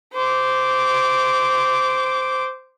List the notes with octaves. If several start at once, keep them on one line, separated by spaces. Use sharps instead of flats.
C5 D6